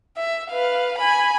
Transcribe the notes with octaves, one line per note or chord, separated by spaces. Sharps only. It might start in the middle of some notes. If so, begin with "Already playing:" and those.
E5
B4 F5
G#5 B5